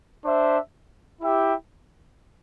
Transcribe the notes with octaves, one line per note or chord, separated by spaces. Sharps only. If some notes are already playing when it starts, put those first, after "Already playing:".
D4 C5 E5
E4 G4 E5 G5